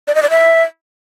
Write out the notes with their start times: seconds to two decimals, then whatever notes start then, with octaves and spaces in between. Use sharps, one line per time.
0.08 D5
0.15 D#5
0.23 D5
0.30 E5